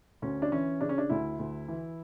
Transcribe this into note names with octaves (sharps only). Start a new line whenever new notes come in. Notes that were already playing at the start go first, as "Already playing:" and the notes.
D2 C#4
D4
E3 C#4
C#3 D4
C#4
D4
D2 E4
D2
E3